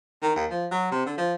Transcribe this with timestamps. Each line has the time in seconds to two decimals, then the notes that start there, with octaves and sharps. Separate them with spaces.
0.22 D#3
0.36 D#2
0.50 F3
0.71 F#3
0.91 C3
1.06 D3
1.17 F3